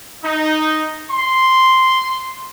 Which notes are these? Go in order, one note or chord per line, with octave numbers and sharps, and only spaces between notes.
D#4
C6